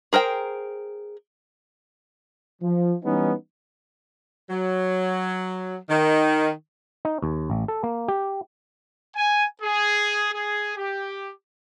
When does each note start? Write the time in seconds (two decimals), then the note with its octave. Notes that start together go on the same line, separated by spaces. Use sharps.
0.13 G#4 A#4 C5 G5
2.62 F3
3.04 E3 G3 B3 C#4 D#4
4.50 F#3
5.90 D#3
7.05 D#4
7.22 D#2
7.50 A1
7.68 A4
7.83 A#3
8.08 G4
9.16 G#5
9.62 G#4
10.33 G#4
10.77 G4